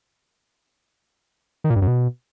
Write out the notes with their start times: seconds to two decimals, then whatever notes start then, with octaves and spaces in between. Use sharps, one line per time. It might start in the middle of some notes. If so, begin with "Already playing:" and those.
1.64 D#3
1.70 A#2
1.76 G2
1.82 F#2
1.87 B2